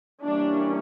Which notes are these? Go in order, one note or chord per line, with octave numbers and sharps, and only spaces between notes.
E3 G3 A#3 C#4 D4